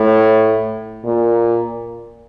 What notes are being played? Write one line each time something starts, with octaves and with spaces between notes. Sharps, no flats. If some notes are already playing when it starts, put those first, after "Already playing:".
Already playing: A2
A#2